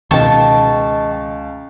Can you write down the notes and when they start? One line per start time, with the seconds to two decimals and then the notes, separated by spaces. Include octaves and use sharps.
0.11 C#2 B2 D#3 D#5 G5 A5 C#6